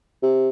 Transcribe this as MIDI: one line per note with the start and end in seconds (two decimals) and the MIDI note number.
0.22 0.49 48